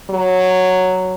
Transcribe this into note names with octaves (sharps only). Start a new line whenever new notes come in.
F#3